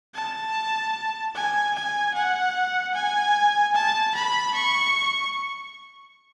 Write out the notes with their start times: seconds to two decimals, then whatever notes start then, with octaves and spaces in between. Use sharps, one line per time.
0.14 A5
1.35 G#5
1.75 G#5
2.14 F#5
2.94 G#5
3.74 A5
4.15 B5
4.54 C#6